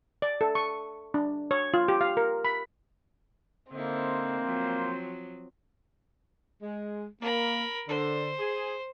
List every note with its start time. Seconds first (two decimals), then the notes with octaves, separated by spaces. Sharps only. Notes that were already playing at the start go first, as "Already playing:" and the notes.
0.22 D5
0.41 A4
0.55 C#6
1.14 D4
1.51 C#5
1.74 F4
1.88 G4
2.01 F5
2.17 A#4
2.45 B5
3.72 D3 A#3 C4 D#4 E4 C5
4.42 F3 F#3
6.62 G#3
7.21 A#3 A#4 B5
7.89 D3 C5
8.39 G#4